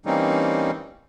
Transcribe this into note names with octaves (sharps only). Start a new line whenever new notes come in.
E3 G3 A#3 C4 C#4 D#4